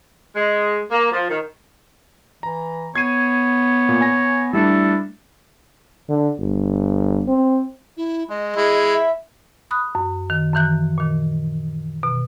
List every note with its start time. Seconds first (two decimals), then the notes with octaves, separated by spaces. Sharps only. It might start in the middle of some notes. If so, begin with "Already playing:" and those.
0.36 G#3
0.90 A#3
1.12 F3
1.29 D#3
2.43 E3 A#5
2.95 B3 C#5 G#6 C7 D#7
3.89 A#2
4.01 G#5 A#6
4.53 G3 A3 D4 E4 A4
6.09 D3
6.39 G1
7.28 C4
7.97 E4
8.30 G#3 D#5
8.56 G#3 E4
8.93 E5
9.71 B5 D#6 F#6
9.95 F#2
10.30 D#3
10.54 F#2 D#3 E3 F#6
10.98 A#2 D#3
12.03 B2